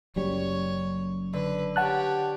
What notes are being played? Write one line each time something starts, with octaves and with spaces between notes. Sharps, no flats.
F#1 F#2 G3 C#5
D3 B4
G4 C#5 F#5 A5 F#6